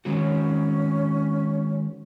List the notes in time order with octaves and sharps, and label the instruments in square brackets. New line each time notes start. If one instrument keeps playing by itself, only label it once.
[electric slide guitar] D#3 G#3 F#4 [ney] C#4